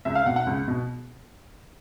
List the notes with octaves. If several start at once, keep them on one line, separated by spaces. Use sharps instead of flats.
C#2 E5
F5
B2 F#5
F#5
C#2
B2